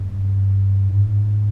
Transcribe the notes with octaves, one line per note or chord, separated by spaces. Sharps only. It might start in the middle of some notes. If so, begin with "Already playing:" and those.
Already playing: G2
G#2